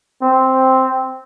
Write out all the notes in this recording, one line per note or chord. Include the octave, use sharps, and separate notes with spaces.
C4